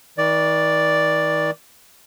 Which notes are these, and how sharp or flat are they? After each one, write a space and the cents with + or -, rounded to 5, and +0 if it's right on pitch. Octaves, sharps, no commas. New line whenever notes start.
D#3 +45 D5 +0